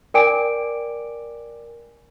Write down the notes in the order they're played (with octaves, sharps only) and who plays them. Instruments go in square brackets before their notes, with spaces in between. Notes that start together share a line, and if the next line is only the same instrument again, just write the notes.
[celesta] A#4 D5 G5 G#5 D6 D7